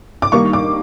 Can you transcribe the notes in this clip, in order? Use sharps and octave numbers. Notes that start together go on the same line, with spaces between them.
D6
D#3 G3 A#3 D#4 C#6
D6